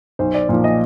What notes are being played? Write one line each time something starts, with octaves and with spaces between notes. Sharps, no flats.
B1 C5
D5
A#2 F3 D5
D#5